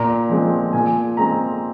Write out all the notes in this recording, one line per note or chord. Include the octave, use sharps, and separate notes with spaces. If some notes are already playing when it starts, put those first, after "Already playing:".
Already playing: A#2 A#5
F3 G#3 C4
A#2 G#5
G#3 C4 A#5